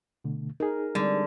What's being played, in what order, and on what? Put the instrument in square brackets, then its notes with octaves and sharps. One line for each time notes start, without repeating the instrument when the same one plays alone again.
[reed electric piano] B2 D3 A3
[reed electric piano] D#4 G#4 [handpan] A#4
[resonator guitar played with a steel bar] D3 [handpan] G3 G#3 C4